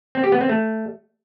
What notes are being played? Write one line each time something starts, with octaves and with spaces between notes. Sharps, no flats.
C4
G4
B3
C4
A3